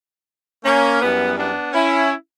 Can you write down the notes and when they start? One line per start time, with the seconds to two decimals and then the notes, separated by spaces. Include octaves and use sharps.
0.65 A#3 C#4
1.01 F#2 E3 G3 B3
1.38 B3 D4
1.73 C#4 E4